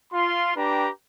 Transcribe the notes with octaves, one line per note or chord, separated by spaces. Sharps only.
F4 C6
D4 G4 B4 G5 A#5